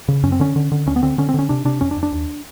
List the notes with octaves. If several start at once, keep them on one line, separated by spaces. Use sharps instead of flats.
C#3
F#2 C#4
C4
D3 C#4
D3
D3
D2 C#4
B3
D3 C4
D3 C#4
C4
D3 C#4
C3 D4
C3 D4
F2 C#4
D4
F2
D4
D#2